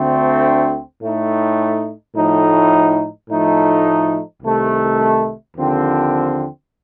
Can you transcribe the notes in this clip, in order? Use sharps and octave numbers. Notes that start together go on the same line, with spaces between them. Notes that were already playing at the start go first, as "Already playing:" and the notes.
Already playing: D2 D3 A3 C4
A2 A3 D#4
A2 F3 A3 D#4
A2 F3 A3 D#4
C2 C3 D#3 A3
D#2 D3 F3 C4